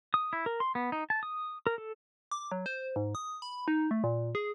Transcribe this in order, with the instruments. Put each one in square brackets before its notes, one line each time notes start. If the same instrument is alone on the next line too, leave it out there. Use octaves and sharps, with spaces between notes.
[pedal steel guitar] D#6
E4
A#4
C6
B3
D#4
A5
D#6
A#4
A4
[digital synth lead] D6
F#3
C5
G#2
D#6
B5
D#4
A3
A#2
G#4